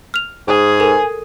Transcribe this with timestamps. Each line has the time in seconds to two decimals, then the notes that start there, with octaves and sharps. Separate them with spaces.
0.14 F6 F7
0.48 G#2 G#4
0.80 A4 A#4 G#5